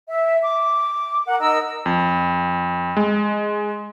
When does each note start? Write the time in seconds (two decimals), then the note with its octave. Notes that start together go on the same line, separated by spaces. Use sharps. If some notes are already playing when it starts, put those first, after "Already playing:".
0.08 E5
0.43 D6
1.26 A#4 F#5
1.39 D#4 A#4 D#5 E6
1.86 F2
2.97 G#3